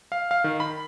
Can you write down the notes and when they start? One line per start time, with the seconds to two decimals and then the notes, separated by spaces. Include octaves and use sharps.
0.12 F5
0.31 F5
0.44 D#3
0.60 B5